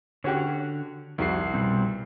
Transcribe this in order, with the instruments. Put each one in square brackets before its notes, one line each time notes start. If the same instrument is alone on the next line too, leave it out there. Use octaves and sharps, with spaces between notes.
[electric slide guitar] D3 [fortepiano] C#4 F#4 G4
[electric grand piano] C2 C7 [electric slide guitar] F2 [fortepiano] D#3 F#4
[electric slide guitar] B2 G3 C4